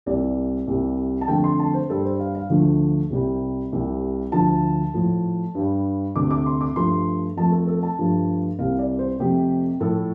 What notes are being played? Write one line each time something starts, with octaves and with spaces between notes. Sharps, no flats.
C2 C3 G3 D5
C2 C3 G3
A5
F2 D3 A3 G5
C6
A5
C5
G2 G3 A4
C5
F5
F5
D2 D3 F3 A3
C2 C3 G3
C2 C3 G3
D2 D3 F3 A5
A2 F3 A3
G2 G3
D2 C3 A3 D6
D6
C6
D6
G2 F3 A3 C6
F2 F3 A3 A5
A4
A4
A5
G2 F3 A3
C2 C3 G3 F5
D5
C5
F2 C3 A3 G4
A2 F3 A3 A4